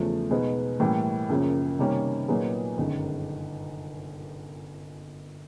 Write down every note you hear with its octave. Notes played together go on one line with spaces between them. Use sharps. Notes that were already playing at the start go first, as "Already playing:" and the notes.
Already playing: E2 C#3 F3 A3
B2 G#3 B3 D#4
A2 E3 G3 A#3
F#2 C#3 F3 A#3
C3 D#3 G3 A#3 C#4
A#2 F#3 B3 D#4 G#4
G1 F#2 D#3 G#3